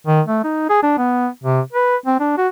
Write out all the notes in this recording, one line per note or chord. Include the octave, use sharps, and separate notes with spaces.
D#3
A3
D#4
G#4
D4
B3
C3
B4
C4
D4
F#4